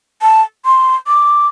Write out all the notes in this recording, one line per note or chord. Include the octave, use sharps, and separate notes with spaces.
A5
C6
D6